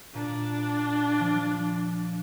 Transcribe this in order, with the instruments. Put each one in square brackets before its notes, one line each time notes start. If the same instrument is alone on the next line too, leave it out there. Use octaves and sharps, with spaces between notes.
[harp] A#2 [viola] D4
[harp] F3